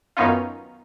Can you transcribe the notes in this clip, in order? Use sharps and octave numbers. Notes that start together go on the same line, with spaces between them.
F#2 D#3 B3 C#4 D#4 F4